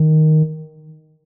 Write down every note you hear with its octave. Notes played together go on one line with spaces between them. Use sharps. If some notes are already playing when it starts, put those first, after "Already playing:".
Already playing: D#3